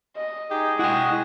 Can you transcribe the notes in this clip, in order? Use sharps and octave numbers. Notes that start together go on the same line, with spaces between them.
D#5
D#4 G4 G#4
G#3 E4 F#4 G5